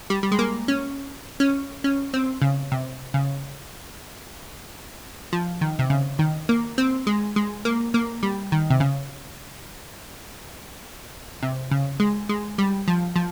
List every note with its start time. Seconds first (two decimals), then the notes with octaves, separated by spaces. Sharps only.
0.10 G3
0.23 G3
0.32 G#3
0.39 A#3
0.68 C#4
1.40 C#4
1.84 C#4
2.14 C4
2.42 C#3
2.72 C3
3.14 C#3
5.33 F3
5.61 D#3
5.79 C3
5.90 C#3
6.19 D#3
6.49 A#3
6.78 C4
7.07 G#3
7.36 G#3
7.65 A#3
7.94 A#3
8.23 G3
8.52 D#3
8.70 C3
8.80 C#3
11.43 C3
11.71 C#3
12.00 G#3
12.29 G#3
12.58 G3
12.88 F3
13.16 F3